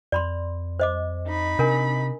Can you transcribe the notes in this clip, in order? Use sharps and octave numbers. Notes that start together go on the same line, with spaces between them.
F2 D5 B5 C6
C5 D#5 D6
D#4 B5
C3 D4 A#4 G#5